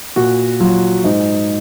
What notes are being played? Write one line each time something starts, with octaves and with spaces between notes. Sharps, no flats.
A#2 F#4
F#3 F4
G#2 D#4